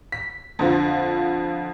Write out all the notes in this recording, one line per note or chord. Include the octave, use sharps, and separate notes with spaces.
B6
F2 D3 F3